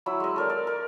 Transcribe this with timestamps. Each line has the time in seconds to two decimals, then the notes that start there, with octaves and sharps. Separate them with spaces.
0.06 F#3 E4 B5 E6
0.20 G#3 D#5
0.36 A4 A#4 D5
0.50 D5
0.67 A#4